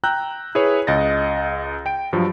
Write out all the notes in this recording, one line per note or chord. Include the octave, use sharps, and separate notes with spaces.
G5 A#5 E6 F#6 G6
E4 G#4 B4 C#5
C#2 D#5 A6 A#6
G5 D7
G2 F3 F#3